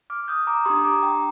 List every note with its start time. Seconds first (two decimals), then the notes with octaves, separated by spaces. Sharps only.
0.10 D6 F6
0.28 D#6 G6
0.47 A#5 D6
0.65 D4 G4 C6 D#6
0.84 A#5 D6
1.03 G5 A#5